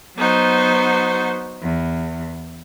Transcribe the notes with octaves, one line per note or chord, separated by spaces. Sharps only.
F#3 B3 D#4 F#4 C5
E2